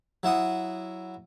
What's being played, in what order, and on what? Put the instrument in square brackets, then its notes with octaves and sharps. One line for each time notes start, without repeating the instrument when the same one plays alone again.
[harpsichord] F#3 E4 F#5 D#6